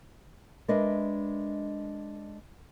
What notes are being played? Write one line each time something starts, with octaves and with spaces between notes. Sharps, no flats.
G#3 D4 A#4 B4 D#5 E5